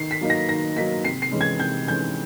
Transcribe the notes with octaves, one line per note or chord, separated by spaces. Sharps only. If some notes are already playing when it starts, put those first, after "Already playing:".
Already playing: D#3 C7
B6
F#3 A#3 D#4
A#6
D#3 A#6
F#3 A#3 D#4 B6
C3 C7
C7
E3 G#3 C#4
G#6
C3 G6
E3 G#3 C#4 G6